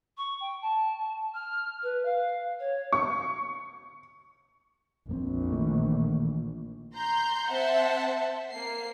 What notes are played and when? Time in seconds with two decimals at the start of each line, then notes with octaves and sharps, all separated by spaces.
0.17 C#6
0.40 G5
0.62 A5
1.34 F6
1.83 B4
2.05 F5
2.59 C#5
2.93 C#6
5.09 A#1 F2 A#3 C4
5.52 D#3 E3 A3
6.93 A#5 C6 G6
7.50 C4 C5 E5 F#5 A5
8.50 A#3 C7